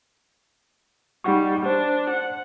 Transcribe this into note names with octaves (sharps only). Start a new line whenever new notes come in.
G3 D#4 F#5 C#6
D4 C5
F#5